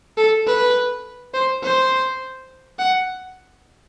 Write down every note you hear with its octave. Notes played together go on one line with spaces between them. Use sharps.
A4
B4
C5
C5
F#5